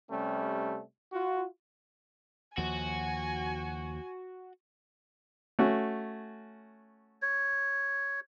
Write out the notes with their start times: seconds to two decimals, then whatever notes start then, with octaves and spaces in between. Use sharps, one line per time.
0.11 C3 G3 A3 C#4
1.13 F4 F#4
2.58 D#2 F3 F#4 G#5
5.59 A3 C#4 F#4
7.22 C#5